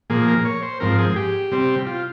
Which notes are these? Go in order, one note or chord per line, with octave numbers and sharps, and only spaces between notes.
A#2 F3 A#3 G#4
A#4
C#5
C5
G#2 F3 C4 A#4
G#4
G4
C3 G3 C4
F4